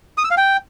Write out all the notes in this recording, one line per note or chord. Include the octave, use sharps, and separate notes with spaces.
D#6
E6
F5
G5